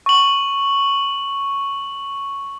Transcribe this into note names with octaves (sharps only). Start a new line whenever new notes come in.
C#6 F#7